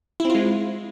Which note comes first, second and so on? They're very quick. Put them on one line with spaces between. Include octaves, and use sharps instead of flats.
E4 C4 F4 G#3